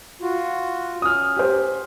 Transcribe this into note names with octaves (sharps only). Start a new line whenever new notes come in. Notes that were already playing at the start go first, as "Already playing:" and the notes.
F4 F#4
C#4 D#6 F6
G4 C5